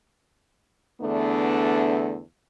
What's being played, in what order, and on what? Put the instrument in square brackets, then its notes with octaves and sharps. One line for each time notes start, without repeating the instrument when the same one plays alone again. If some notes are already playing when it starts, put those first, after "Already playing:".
[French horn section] E2 D3 A3 B3 D4